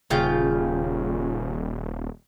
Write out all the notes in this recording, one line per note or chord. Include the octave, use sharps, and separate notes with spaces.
D#1 C#3 F4 G5